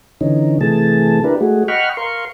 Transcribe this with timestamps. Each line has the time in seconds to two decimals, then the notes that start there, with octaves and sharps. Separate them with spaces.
0.21 D3 E3 C#4 D#4
0.61 C3 E3 A3 G#4 A5
1.24 D4 E4 G4 A#4 B4
1.41 G#3 A3 F#4 G#4
1.68 D#5 F#5 G5 B5 C#6 F6
1.97 A#4 F5 C6 C#6